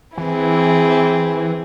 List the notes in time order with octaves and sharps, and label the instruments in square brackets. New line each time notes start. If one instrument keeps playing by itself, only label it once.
[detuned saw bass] E3 [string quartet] C4 E4 G#4